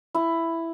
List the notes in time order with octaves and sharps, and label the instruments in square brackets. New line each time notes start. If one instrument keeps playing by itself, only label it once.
[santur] E4